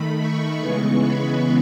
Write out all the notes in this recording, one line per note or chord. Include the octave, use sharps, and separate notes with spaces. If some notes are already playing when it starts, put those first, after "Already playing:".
Already playing: D#3 A3 B5
C#6
C#3 E3 G#3 B3 C#6
B5